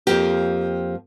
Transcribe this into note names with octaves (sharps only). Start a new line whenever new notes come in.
F2 F3 A#3 G4